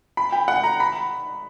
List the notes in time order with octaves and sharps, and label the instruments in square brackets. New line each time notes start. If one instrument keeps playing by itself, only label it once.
[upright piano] B5
G5
F#5
A#5
B5